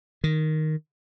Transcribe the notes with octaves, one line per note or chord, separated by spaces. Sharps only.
D#3